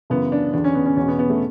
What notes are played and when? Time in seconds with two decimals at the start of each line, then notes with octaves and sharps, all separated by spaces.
0.10 F#2 C#3 E3 B3
0.32 D4
0.53 E2 D3 D4
0.64 C#4
0.75 B3
0.86 C#4
0.97 E2 B2 C#4
1.08 B3
1.19 B3
1.30 A3